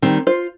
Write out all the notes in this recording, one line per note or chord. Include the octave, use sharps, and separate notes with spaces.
D#3 G3 C4
F4 C5